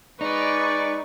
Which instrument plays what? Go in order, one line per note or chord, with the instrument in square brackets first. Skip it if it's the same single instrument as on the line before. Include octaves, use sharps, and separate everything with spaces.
[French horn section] G#3 D5 [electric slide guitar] D#4 [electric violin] B4 C#6